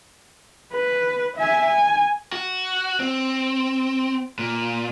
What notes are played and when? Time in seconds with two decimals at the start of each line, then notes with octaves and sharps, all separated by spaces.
0.72 B4
1.37 E5 G#5
1.67 G#5
2.32 F#4
3.00 C4
4.39 A#2